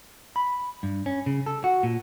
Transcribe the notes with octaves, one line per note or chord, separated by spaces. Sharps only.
B5
G2
C#4
C#3
A4
F#4
A#2